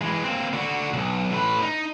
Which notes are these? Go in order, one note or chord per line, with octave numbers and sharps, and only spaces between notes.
E3 G#3
A#3 C4
D3 F#4
B1
A2 B4
D#4